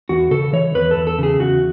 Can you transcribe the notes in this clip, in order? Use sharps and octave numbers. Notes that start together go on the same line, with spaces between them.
E2 F#4
C#3 A4
E3 C#5
E2 B4
A4
E2
A4
C#3 G#4
E2 F#4